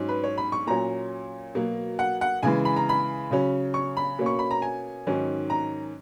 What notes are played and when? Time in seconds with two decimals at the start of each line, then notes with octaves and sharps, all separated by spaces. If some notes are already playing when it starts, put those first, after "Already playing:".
Already playing: G#2 F#3 C#4
0.09 B4
0.24 C#5
0.38 B5
0.52 C#6
0.67 A#2 F#3 C#4 A#5
1.55 B2 F#3 A#3
1.99 F#5
2.21 F#5
2.43 C#3 E3 G#3 G#5
2.65 B5
2.76 A#5
2.89 B5
3.31 C#3 F#3 C#4
3.74 C#6
3.97 B5
4.18 B2 A#3 C#4
4.26 C#6
4.39 B5
4.51 A#5
4.62 G#5
5.07 G#2 D#3 F#3 C#4
5.50 A#5